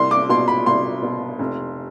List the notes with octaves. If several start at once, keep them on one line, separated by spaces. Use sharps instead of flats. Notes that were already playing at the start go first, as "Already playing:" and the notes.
Already playing: C2 C6
D6
B2 C6
B5
C2 C6
B2
F1